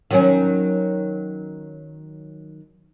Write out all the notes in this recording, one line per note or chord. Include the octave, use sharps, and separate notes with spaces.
D#3 F#3 C#4